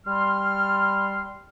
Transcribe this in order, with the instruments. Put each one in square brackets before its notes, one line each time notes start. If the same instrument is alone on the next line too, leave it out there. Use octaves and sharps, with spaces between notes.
[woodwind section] G3 F6 [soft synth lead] C6